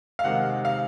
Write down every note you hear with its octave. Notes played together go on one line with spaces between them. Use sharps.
F5
C3 D#3 G#3 F#5
F5